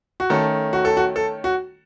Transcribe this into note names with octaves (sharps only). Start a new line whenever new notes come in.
F#4
D#3 A3 C#4 A4
F#4
A4
F#4
A4
F#4